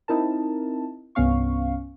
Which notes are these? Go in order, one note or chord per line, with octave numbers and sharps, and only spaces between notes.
C4 D#4 E4 A#4 A5
C2 G2 B3 C#4 F5 C#6